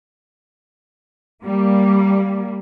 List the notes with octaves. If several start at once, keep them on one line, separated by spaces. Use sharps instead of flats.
G3 A#3